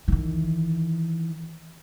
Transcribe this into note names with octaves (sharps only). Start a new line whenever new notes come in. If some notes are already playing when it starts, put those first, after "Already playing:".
D#3 E3